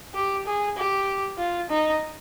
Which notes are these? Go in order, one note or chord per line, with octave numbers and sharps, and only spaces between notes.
G4
G#4
G4
F4
D#4